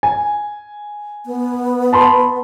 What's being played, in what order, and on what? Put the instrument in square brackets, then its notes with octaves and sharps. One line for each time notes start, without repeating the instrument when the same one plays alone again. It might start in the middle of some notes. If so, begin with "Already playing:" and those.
[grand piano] G#5
[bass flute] B3
[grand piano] A5 B5 C6